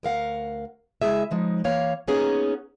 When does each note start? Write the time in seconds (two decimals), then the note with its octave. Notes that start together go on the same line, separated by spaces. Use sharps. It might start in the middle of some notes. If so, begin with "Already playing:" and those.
0.03 D2 A#4 F5 F#5
1.02 C#3 G#3 E4 G#4 E5
1.31 F3 G#3 D#4
1.64 E3 A#3 C#5 F5
2.08 A#3 B3 C#4 D#4 G#4